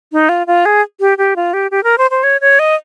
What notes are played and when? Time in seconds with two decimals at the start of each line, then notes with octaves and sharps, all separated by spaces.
0.12 D#4
0.29 F4
0.47 F4
0.66 G#4
1.00 G4
1.18 G4
1.36 F4
1.54 G4
1.71 G4
1.84 A#4
1.98 C5
2.11 C5
2.23 C#5
2.41 C#5
2.59 D#5